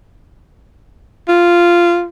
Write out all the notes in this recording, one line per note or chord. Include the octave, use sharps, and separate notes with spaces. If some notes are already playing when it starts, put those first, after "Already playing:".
F4